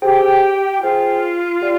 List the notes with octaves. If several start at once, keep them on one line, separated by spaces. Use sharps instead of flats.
G4 G#4 C5 G5
F4 G#4 C5 G5
G4 D5 F5